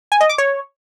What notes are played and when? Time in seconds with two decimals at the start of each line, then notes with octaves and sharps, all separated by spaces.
0.12 G#5
0.21 D#5
0.29 D6
0.38 C#5